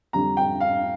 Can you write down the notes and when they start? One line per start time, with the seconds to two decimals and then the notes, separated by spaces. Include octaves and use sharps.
0.13 F2 D3 G3 A#5
0.37 G5
0.60 F5